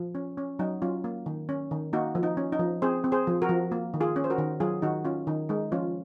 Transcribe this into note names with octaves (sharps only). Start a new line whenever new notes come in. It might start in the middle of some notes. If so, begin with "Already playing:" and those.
Already playing: F3
C#4
C#4
F#3 D#4
F#3 C#4 F4
A#3
D#3
C#4
D#3
A#3 D#4 F#4
F3
D#4
C#4
D#4
F3
C4 G#4 C5
C4
G#4 C5
F3
F#4 A#4
F3
A#3
D#3
F4 G#4
C#4
C5
F#4 A#4
D#3
F#3 F4 G#4
D#3 D#4 F#4
C#4 F4
D#3 D#4
G#3 D#4
F3 C#4 F4